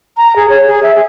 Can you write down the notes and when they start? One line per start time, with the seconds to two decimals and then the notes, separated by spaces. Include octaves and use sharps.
0.17 A#5
0.36 G#4
0.49 C#5
0.67 G#4
0.83 E5
0.95 G#4